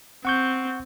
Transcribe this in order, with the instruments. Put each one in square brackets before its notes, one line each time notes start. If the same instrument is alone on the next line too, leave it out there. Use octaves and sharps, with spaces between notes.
[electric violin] C4 [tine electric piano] F#5 C#6 G6